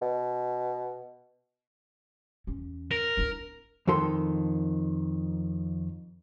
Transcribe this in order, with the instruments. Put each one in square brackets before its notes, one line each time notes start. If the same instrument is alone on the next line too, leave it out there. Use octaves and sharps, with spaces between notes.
[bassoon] B2
[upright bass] E2 C#4
[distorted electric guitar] A#4
[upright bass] D4 E4
[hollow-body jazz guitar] F2 D#3 A4 C6